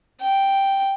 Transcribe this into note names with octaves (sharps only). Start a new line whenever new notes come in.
G5